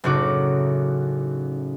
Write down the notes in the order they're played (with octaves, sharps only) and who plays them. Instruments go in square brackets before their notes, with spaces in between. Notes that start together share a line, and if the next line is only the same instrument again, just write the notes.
[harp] F#1 A2 C#3 D#4 F#4 D6